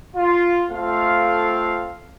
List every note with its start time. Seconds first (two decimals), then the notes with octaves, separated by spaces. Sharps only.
0.15 F4
0.70 A3 C4 F4 A4 F5